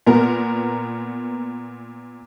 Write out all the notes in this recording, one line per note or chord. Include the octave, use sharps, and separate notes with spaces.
A#2 B3 A#4